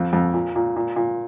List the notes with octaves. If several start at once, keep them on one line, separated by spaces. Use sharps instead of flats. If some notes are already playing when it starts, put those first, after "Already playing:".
Already playing: F2
F2
A#2
A#2
A#2
A#2